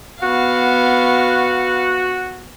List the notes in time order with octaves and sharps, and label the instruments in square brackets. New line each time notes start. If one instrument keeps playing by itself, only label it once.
[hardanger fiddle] B3 F5 [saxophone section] F#4